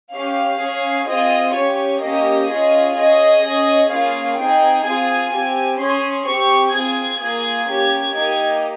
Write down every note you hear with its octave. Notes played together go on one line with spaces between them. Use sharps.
C#4 G4 F5
C#4 G#4
C4 F4 G#4 D#5
C#4 G4 C#5
A#3 C#4 G4 D#5
C#4 F4 G#4
C#4 G#4 D#5
C#4 G#4
A#3 C#4 F4 G#4 F5
C4 D#4 G#4 G5
C4 F4 G#4 G#5
C4 G4
C#4 G#4 C6
C4 G4 C#6
C4 F4 G#4 G#6
A#3 F4 G#4 G#6
A#3 C#4 G4
A#3 D#4 G4